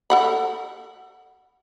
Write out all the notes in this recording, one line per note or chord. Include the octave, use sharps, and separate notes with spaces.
A4 F#5 B5